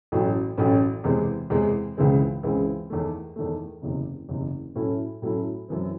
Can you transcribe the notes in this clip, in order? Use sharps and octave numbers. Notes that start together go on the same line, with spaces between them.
A1 A2 F#3 C#4
A1 A2 F#3 C#4
E2 C3 E3 G#3 C4
E2 C3 E3 G#3 C4
C#2 C#3 E3 G#3 C4
C#2 C#3 E3 G#3 C4
E2 D#3 A3
E2 D#3 A3
F#1 E2 C3
F#1 E2 C3
A2 F#3 A3 C#4 E4
A2 F#3 A3 C#4 E4
F#2 E3 C4